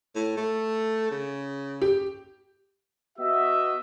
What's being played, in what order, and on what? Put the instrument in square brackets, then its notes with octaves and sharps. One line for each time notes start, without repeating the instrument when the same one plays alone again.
[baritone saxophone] A2
A3
C#3
[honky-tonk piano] G4
[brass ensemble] B3 F#4 D#5 E5